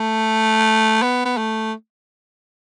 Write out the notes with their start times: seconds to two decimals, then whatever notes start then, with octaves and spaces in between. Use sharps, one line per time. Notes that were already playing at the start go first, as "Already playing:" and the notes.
Already playing: A3
1.02 B3
1.25 B3
1.37 A3